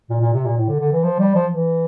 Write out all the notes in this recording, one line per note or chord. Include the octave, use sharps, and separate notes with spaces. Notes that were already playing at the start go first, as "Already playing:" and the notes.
A#2
A#2
C3
A#2
A2
D3
D3
E3
F3
G3
F3
E3